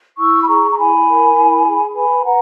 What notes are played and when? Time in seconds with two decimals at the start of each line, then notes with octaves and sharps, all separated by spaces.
0.18 E4 C#6 E6
0.40 B5
0.48 G#4 A#5 C#6
0.70 A#5
0.77 E4 G#5 B5
1.07 A#4
1.37 E4
1.66 G#4
1.95 B4 G#5 B5
2.25 B4 F#5 A#5